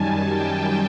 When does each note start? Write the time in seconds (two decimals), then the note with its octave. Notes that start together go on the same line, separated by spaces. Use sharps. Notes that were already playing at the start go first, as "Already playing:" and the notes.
Already playing: F#2 D#3 G3 G#5 A5
0.31 G5